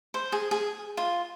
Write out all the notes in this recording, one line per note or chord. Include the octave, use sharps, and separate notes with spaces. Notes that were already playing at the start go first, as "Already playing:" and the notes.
C5
G#4
G#4
F4